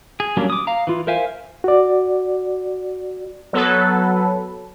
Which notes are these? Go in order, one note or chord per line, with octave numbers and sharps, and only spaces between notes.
G#4
F#3 G3 A#3 C#4 D4
D6 D#6
F5 A#5
E3 F4
A#4 C5 E5 F5 G#5
F#4 D5
F#3 B3 A4 B4